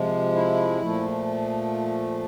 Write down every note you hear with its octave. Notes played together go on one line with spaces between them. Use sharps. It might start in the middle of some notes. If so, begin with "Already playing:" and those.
Already playing: C3 F3 G#3
E4
A#2 F3 A3